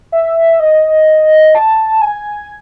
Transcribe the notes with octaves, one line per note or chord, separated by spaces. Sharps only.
E5
D#5
A5
G#5